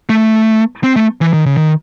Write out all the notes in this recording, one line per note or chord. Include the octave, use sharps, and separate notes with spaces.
A3
C4
A3
E3
D#3
C#3
D#3